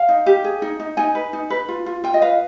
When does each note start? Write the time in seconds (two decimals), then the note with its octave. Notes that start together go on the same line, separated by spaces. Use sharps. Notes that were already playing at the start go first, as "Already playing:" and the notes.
Already playing: F5
0.09 D#4
0.26 G4
0.44 G#4
0.62 D#4
0.80 D#4
0.97 D#4 G#5
1.15 B4
1.33 D#4
1.50 B4
1.68 F4
1.86 F4
2.04 F4 G5
2.14 D#5
2.21 B4 F5